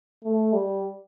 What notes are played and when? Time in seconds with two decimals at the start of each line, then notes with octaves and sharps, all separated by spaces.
0.24 A3
0.53 G3